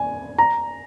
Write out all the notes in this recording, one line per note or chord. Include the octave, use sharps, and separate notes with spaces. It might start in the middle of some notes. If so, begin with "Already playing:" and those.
Already playing: G#5
A#5